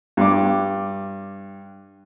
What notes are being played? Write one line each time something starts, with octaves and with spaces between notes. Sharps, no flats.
G2 D6